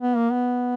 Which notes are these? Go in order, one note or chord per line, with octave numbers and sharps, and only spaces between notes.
B3
A#3
B3